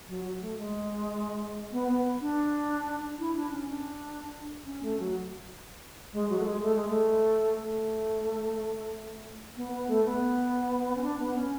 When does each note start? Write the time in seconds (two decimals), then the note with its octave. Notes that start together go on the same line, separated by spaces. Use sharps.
0.08 F#3
0.24 F#3
0.41 A3
0.58 G#3
1.72 B3
1.88 B3
2.21 D4
3.19 E4
3.36 D4
3.51 C#4
3.68 D4
4.66 C#4
4.83 A3
4.99 F#3
6.13 G#3
6.30 F#3
6.39 A3
6.46 G#3
6.62 A3
6.75 G#3
6.88 A3
7.60 A3
9.57 B3
9.72 B3
9.88 A3
10.05 B3
10.96 C#4
11.03 D4
11.19 B3
11.35 C#4